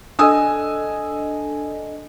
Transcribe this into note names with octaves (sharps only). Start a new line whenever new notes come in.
D4 A4 D#5 G#5 D#6 E6